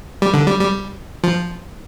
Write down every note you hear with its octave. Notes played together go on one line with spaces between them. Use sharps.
G3
D3
G3
G3
F3